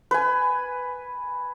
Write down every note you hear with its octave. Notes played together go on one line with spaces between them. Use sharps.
B4 G#5